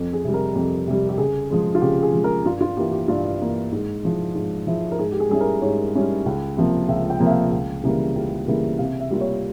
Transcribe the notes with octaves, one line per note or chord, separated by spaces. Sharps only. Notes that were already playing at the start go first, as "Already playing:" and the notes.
Already playing: F2
G#4
C3 G3
A#4
F2
C3 G3
G4
C#3 G#4
F3 G#3
F4
C#3 G4
G#4
F3 G#3
A#4
G2 F4
F4
E3 A#3 G4
G4
G2 F4
E3 A#3
G#2
F3 G#3 E4
G#2
F3 G#3 E4
A#4
G#2 G#4
G4
G#4
G3 C#4 E4 G#4
A#4
G#2 C#5
G3 C#4 E4
C#2
C3 F3 A#3
C#2 E5
G5
C3 F3 A#3
E5
F5
C#2
C#3 E3 G3 A#3
C#2
C#3 E3 G3 A#3
C3 F5
E5
G3 A#3 F4
C#5